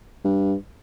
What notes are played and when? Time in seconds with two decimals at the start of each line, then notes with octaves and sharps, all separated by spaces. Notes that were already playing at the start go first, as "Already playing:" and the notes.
0.24 G2